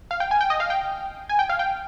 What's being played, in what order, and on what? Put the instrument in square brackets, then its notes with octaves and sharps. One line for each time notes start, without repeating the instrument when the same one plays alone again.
[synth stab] F5
G5
G#5
G5
D#5
F5
G5
G#5
G5
F5
G5